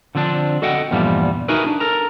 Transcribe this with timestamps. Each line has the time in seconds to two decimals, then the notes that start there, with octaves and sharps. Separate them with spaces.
0.15 D3 F3 C4 D4
0.62 F#4 A4 D#5 F#5 G5
0.91 E2 G2 A#2 F3 G3 B3
1.48 D#4 E4 F#4 G#4 A#4 B4
1.66 D4
1.80 A4 A#4 A#5